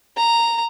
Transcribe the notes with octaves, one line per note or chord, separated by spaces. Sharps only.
A#5